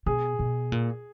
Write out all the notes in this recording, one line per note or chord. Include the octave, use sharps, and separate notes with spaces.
B2 G#4
B2
A#2